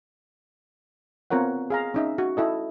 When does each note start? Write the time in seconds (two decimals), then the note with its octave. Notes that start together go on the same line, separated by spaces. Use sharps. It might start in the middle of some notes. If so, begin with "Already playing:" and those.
1.30 B3 C4 F4 A#4 C#5 F#5
1.70 G#4 F5 A#5
1.94 C#4 D#4 E5
2.18 F#4
2.37 E4 A4 D#5